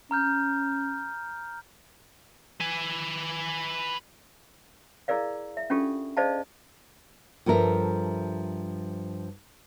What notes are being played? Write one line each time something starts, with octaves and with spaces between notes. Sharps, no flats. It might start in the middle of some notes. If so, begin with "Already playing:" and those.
C#4 A#5 F6 G6
B4 G#5
E4 G#4 A#4 D5 F5
E5
C#4 D4 F4 G4 A4
G#4 C5 D5 D#5 F5 A5
G2 F3 A4 A#4 E5